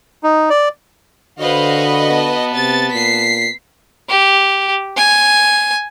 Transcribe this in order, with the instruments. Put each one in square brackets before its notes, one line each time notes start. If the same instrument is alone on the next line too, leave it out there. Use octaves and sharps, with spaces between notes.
[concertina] D#4
D5
[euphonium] D3 [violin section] F#4 B4 D#5 [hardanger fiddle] C5 F5
[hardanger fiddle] B3 A5
[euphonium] C3 [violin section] A6
[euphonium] A#2 [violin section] B6 C7
[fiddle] G4
G#5